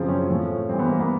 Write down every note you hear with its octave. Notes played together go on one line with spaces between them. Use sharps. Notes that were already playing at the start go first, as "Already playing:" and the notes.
Already playing: F#2 C#3 F3 C4
C#4
A2 F3
G2 E3 C4
B3
A#3
B3